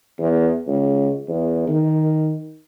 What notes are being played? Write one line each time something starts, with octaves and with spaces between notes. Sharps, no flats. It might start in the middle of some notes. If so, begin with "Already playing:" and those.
E2
C#2
E2
D#3